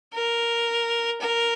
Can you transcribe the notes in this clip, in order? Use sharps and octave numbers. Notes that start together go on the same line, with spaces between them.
A#4
A#4